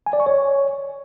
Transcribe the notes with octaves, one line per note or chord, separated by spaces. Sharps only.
G#5
D5
C#6
C#5